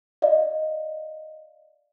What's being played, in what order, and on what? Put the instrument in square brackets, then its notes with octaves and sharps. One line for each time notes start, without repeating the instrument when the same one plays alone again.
[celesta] D5 D#5 F5